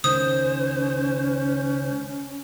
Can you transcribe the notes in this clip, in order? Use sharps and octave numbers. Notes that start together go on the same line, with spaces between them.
C#2 D#3 C#4 C5 D#6